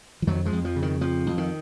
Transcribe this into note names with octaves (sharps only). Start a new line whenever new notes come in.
F3
F2 D#3 F#3
F3 G#3
F2
F3
C#3
D#3
F2 F3
F2
D#3